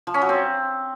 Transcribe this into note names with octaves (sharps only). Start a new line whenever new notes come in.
F3
C#4
F#3
C4